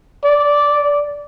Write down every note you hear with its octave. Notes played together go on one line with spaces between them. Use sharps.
D5